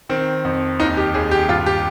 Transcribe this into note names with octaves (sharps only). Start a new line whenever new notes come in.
D#3 C4
F2
D#2 D#4
G4
D#2 G#4
G4
G2 F4
G4